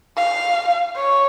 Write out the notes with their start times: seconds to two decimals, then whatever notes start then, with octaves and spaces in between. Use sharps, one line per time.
0.17 F5
0.96 C#5